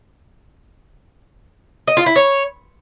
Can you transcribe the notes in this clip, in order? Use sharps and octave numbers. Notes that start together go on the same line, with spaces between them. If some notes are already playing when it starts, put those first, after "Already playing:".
D#5
F4
E4
C#5